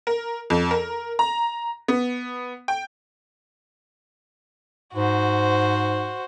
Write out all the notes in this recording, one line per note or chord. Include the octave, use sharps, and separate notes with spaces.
A#4
F2
A#4
A#5
B3
G5
G#2 F#4 C5